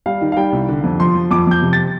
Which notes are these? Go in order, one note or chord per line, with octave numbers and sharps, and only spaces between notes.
G3 F5
D#3
F5
G3 G5
C2
D3
F2
F3 C6
F3
F2 D6
F2 G6
C3
A6